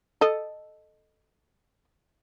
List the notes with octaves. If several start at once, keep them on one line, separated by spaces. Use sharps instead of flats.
A4 D#5